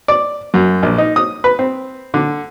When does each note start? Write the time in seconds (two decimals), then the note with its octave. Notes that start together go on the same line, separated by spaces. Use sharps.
0.08 D5
0.54 F#2
0.83 A#1
0.98 D#4
1.16 D#6
1.44 B4
1.59 C4
2.14 D3